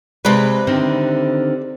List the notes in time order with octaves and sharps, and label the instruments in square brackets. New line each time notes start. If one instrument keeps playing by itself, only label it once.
[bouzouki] C3 B4 [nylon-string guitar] G#3 D5
[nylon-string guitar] D3 D#3 C4